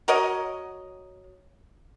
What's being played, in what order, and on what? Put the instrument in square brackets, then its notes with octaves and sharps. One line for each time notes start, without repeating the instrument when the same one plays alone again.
[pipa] F#4 A#4 C#5 D#5